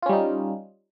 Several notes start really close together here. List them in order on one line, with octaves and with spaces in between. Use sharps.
F4 C#4 G3 D#4